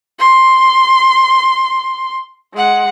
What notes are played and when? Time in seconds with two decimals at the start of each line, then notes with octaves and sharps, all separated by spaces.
0.19 C6
2.54 G#3 F#5